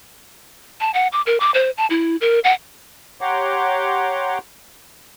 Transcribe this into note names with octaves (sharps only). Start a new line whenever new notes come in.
A5
F#5
D6
A#4
D6
C5
A5
E4
A#4
F#5
G4 C#5 F#5 A#5 C6 D6